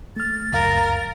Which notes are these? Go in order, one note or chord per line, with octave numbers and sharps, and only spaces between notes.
A3 F6 A6
C#2 F#2 A#4 F5